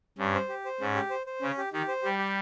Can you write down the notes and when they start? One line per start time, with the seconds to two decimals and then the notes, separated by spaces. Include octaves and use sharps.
0.18 G2 C#4
0.34 C5
0.49 G4
0.65 C5
0.81 G#2 C#4
0.95 G4
1.10 C5
1.27 C5
1.42 C#3 C#4
1.57 G4
1.73 D#3 G4
1.88 C5
2.03 G3 G4
2.18 G4